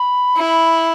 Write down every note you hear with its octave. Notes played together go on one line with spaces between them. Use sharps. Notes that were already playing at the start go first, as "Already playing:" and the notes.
Already playing: B5
E4